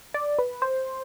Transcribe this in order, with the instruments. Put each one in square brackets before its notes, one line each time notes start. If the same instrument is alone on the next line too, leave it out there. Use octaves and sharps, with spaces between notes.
[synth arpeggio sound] D5
B4
C5